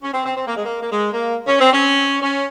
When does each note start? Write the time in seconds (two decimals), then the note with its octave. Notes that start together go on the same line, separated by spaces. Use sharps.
0.03 C#4
0.14 C4
0.25 C4
0.36 C4
0.46 A#3
0.56 G#3
0.65 A#3
0.81 A#3
0.91 G#3
1.13 A#3
1.47 C#4
1.59 C4
1.73 C#4
2.22 C#4